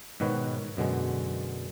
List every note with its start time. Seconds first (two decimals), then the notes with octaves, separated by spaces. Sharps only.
0.20 G#2 B2 D#3 F#4 B4 C#5
0.77 F#2 B2 D3 G#3